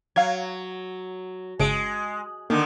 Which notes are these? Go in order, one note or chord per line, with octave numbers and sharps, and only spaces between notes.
F#3 F5 G#6
G1 C#3 G#3 D7
D3 D#3 A#3